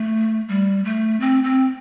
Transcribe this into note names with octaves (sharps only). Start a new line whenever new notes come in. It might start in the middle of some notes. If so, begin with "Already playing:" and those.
Already playing: A3
G3
A3
C4
C4